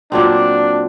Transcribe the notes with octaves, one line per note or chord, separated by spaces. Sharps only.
A#2 F#3 C4 D4